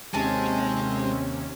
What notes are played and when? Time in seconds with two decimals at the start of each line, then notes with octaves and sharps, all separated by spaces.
0.14 D#2 C3 G#3 C4 C#4 G#5 A5